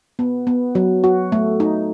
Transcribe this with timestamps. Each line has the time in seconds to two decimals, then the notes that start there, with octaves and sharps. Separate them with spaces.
0.19 B3
0.47 B3
0.75 F#3
1.04 F#4
1.32 A3
1.60 D#4